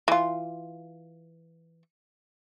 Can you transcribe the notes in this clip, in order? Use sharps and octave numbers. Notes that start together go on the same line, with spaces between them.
E3 F4